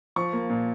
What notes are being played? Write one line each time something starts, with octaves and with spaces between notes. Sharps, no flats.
F3 C#6
A#3
A#2